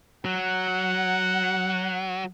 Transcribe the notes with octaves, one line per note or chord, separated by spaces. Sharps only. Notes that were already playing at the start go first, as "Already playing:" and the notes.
F#3 F#5